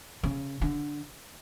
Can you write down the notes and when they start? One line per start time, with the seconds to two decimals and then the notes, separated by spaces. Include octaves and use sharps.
0.23 C#3
0.62 D3